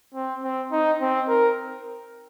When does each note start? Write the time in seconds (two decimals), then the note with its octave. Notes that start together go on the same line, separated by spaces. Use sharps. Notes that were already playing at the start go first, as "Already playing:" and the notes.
0.15 C4
0.43 C4
0.72 D#4
1.01 C4
1.29 A#4